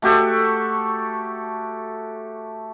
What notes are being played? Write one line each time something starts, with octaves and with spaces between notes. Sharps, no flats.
A3 F#4 G4 A4